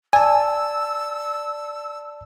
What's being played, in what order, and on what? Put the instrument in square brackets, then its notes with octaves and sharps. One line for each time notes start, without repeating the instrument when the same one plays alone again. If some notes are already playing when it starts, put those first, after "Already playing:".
[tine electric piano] D5 A5 [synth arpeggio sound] G#5 [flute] E6